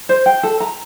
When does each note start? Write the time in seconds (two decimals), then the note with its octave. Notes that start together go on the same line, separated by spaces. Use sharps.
0.09 C5
0.26 G5
0.43 A4
0.60 A#5